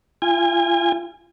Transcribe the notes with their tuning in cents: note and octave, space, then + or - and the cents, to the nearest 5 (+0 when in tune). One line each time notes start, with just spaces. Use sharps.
F4 -35 G#5 -30